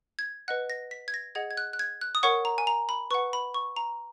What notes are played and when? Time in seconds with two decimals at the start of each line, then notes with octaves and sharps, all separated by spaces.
0.19 G#6
0.48 B4 D#5 F#5 F#6
0.70 A#6
0.91 B6
1.08 G#6
1.14 A#6
1.35 G#4 D#5 F#5 G#6
1.51 G#6
1.57 F#6
1.73 F#6
1.79 G#6
2.01 F#6
2.15 D#6
2.23 A#4 C#5 F#5 C#6
2.45 A#5
2.58 G#5
2.67 A#5
2.89 B5
3.11 B4 F#5 C#6
3.33 B5
3.54 C#6
3.76 A#5